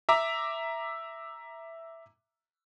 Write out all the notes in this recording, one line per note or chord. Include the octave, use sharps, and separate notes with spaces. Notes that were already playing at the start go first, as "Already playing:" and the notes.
E5 A#5 D6